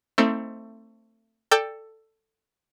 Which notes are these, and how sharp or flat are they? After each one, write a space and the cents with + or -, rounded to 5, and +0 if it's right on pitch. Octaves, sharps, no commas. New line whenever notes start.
A3 +25 C4 +10 D#4 +40
A4 +10 D5 +10 G5 +15